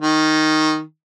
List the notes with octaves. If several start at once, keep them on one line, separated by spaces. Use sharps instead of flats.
D#3